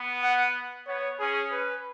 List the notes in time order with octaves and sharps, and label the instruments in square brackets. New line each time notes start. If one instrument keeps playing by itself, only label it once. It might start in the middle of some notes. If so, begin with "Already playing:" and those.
Already playing: [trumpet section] B3
[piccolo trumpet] F#5
[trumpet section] B3 [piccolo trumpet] C#5
[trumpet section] C#4 [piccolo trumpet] G#4
[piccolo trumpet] B4